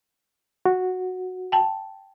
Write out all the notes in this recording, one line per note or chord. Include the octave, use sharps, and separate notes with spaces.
F#4
G5 A5